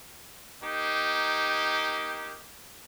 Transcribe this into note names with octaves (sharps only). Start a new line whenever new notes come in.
A#3 D#4 G4